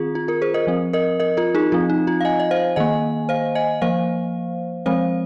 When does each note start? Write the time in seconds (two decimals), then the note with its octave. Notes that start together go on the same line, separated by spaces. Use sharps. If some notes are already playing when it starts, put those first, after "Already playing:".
Already playing: D#3 C4 F4 G#4
0.15 F4
0.28 F4 A#4
0.42 G#4 C5
0.54 A#4 D#5
0.67 F3 C4
0.93 A#4 D#5
1.20 A#4 D#5
1.37 F4 A#4
1.55 D#4 G#4
1.72 F3 C4 F4
1.90 D#4
2.07 F4
2.21 F5
2.25 D#5 G#5
2.40 D#5
2.51 C5 F5
2.76 D#3 A#3 D#5 G#5
3.29 C5 F5
3.55 D#5 G#5
3.82 F3 A#3 C5 F5
4.86 F3 G#3 C4 C5 F5